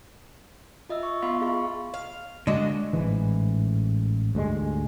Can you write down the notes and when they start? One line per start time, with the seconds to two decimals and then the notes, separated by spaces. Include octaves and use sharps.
0.89 F4 D#5 E5 E6
1.03 C#6
1.22 B3 F4 F5 B5 C6
1.41 E4 G#4 F5 C#6
1.94 F5
2.47 D3 G#3 D4 F#4 D#5
2.93 A1 G#2 E3
4.35 D2 G#2 G3 G#3